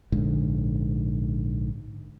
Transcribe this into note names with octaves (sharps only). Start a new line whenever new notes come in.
A#1 G#2 D3